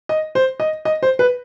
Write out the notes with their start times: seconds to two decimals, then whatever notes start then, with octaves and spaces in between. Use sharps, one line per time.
0.09 D#5
0.35 C5
0.60 D#5
0.85 D#5
1.03 C5
1.19 B4